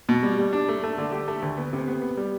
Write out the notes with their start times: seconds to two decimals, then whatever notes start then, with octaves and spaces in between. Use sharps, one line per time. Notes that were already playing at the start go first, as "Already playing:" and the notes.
0.09 B2
0.23 G3
0.38 G3
0.53 D4
0.68 A3
0.83 A3
0.98 D3
1.12 G4
1.28 A3
1.42 D2
1.58 B3
1.73 C3
1.87 B3
2.02 B3
2.17 G3